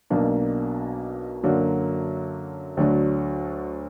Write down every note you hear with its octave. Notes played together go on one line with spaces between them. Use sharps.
B1 B2 A#3 D4
F#2 D3 F#3 A#3 D4
D2 D3 F#3 D4